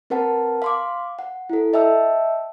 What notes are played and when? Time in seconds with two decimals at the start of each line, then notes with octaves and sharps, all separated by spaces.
0.10 C4 A#4 B4 F#5 A5
0.62 F5 C6 D6
1.19 F#5
1.50 E4 A4
1.73 D#5 E5 G5 A5 E6